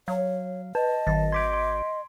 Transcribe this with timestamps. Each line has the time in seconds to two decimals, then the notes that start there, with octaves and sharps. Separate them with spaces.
0.08 F#3 C#5 F5
0.75 B4 D#5 A5
1.07 G#1 D#3 A6
1.32 C6 D6 G6 G#6 B6 D7
1.53 C6